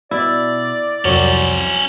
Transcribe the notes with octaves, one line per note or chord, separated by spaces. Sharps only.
B2 E4 D5
C2 F2 F#3 C#4 C5